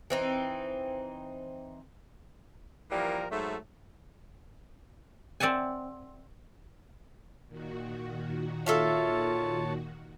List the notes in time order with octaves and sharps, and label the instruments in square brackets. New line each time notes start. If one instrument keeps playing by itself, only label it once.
[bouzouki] E3 C4 D#4
[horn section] E3 F3 G3 A#3 A#4
G#2 F#3 A3
[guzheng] C4 D5 E5 F#5 G#5
[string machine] A#2 D#3 F#4
[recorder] F4 [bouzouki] A4 E5 F5 [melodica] C#5 A5